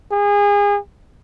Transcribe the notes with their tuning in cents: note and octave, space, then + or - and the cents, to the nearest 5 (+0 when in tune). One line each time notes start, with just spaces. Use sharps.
G#4 -30